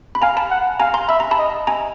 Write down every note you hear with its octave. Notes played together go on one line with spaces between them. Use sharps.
B5
F5 G#5 A#5
A5 B5
F#5
F5 G#5 A#5
A#5 C6
E5 B5
A#5
A5 B5
D#5
G#5 A#5